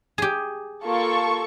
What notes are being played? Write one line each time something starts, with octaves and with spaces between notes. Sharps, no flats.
G4 G#4
A#3 F4 A4 C#6